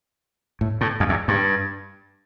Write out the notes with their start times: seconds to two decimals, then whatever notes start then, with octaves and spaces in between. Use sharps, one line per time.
0.61 A2
0.81 A2
1.00 F2
1.09 E2
1.28 G2